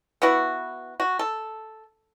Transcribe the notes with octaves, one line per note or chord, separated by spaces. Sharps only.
B3 E4 F#4
F#4
A4